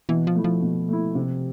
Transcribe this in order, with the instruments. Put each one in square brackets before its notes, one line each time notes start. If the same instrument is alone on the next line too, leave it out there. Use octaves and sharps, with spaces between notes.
[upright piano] B2 [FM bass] E3
[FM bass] F3
[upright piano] A3 E4
[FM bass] F3
[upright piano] B2
A3 E4
C3